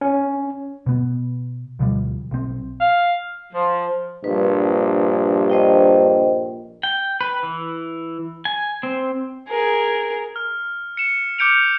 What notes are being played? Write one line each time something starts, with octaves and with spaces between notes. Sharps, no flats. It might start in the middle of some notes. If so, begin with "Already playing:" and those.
C#4
B2 B3
D2 B2 F3 G3
B1 C4
F5
F3
A#1 G2 B4
C5 D#5 G5
G5
B4
E3
G#5
C4
G#4 A#4
F6
C#7 E7
D6 F6 G6 C#7 D7 F7